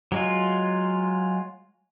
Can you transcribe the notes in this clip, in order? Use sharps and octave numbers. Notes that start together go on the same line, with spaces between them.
F#3 G#3 F4